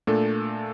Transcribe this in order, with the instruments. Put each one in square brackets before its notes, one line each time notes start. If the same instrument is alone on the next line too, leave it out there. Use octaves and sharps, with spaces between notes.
[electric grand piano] A#2 A3 D4 A4